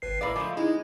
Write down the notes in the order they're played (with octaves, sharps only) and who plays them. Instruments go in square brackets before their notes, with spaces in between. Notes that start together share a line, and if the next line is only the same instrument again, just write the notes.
[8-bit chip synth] G#1 B4 C7
[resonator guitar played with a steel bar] A2 A#4 D5 [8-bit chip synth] F5 B5
[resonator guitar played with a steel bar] F3 G#3 A3
[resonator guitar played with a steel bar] G#3 [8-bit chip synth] D#4 E4